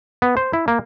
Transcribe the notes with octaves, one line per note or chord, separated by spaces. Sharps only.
B3
C5
E4
A#3